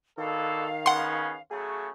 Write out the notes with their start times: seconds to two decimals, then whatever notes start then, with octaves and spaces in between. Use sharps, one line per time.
0.18 B2 D3 D#3 A4 F5
0.86 C#3 B3 C#4 F#5 C6
1.51 C#3 F#3 A3 G#4